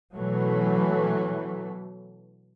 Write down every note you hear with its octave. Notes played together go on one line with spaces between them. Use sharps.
B2 E3 F#3 A3